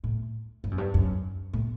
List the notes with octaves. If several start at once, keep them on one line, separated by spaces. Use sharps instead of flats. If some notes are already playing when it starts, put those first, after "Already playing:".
A2
G2
F#2
G2
F#2
A2